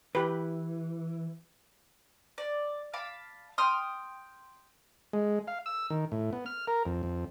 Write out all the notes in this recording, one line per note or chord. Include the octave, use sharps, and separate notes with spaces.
E3 G4 B4
D5
F5 A5 B5 D6
G5 C6 D#6 F6
G#3
F5
E6
D#3
A2
B3
F6
A#4
F2
F2